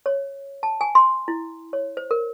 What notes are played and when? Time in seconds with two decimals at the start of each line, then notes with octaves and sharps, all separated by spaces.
0.06 C#5
0.63 A5
0.81 G#5
0.95 C6
1.28 E4
1.73 C#5
1.97 C5
2.11 A#4